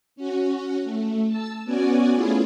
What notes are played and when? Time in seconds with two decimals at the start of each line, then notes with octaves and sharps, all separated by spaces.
0.16 C#4 F#4
0.83 A3
1.28 A5 E6
1.65 B3 C#4 F#4 D5 G#5
2.14 A3 B3 C#4 E4 F4 G#4